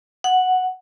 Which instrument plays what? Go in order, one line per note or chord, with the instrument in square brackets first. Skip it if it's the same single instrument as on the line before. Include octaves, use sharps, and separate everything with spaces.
[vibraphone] F#5